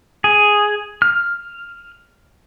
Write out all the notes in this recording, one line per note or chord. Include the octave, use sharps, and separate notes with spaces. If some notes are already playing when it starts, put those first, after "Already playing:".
G#4
F6